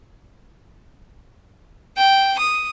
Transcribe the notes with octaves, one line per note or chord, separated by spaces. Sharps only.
G5
D#6